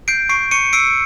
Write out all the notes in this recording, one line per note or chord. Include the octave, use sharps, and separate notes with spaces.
G6 C7 D7
C#6 C7 D7
C#6 C#7 D#7
E6 C7 D7